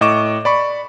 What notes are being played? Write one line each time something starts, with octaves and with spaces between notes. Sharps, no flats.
A2 D#5 C#6 D6 E7
D5 B5 C#6